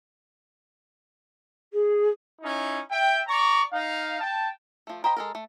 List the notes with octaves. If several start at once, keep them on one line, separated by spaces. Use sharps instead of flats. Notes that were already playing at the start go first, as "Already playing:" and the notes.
G#4
C#4 D#4 E4
E5 G5
D5 A#5 C#6
D#4 F5
G5 A5
F3 A3
A#4 C5 D#5 G5 B5
G#3 A4 A#4
A3